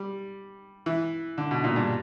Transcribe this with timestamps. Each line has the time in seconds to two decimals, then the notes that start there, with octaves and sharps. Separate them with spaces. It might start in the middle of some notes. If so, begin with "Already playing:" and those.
Already playing: G3
0.86 E3
1.38 D3
1.51 B2
1.64 A#2
1.76 G2